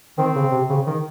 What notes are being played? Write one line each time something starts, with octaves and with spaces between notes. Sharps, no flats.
D#3 C4
C#3
C3
C#3
D#3